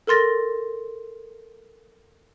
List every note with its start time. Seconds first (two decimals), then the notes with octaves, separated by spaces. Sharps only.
0.07 A4 A#4 C6 A6 A#6